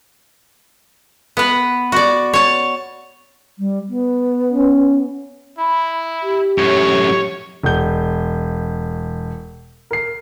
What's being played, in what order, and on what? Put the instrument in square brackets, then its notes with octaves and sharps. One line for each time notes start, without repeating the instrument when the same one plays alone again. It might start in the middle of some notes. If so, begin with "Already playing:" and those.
[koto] B3 B4
F#4 D5
C#5 A5
[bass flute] G3
B3
[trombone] C#4
[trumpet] E4 [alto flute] B5
[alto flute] G4
[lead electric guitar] F#2 A2 [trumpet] C#5
[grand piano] E1 G6
A#4 C7